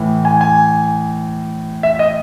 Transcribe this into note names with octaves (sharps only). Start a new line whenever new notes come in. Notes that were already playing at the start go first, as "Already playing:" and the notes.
Already playing: A2 E3
G#5
G#5
E5
D#5